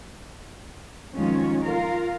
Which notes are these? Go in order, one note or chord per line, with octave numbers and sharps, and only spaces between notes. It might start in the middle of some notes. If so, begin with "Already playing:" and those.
F2 D#3 F#3 G#3 C#4 F4
F4 A#4 F5